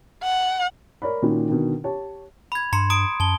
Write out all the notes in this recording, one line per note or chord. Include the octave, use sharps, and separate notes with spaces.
F#5
A#4 C#5 D5 B5
A#2 D#3 C#4 D#4 F#4
B2 D3 D#3
G4 C#5 A5
B5 G#6
G2 A#5 C6 C#7
A#5 D#6 D7
F#2 A5 G7